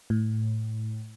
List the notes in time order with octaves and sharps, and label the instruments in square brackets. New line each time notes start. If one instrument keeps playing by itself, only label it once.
[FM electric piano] A2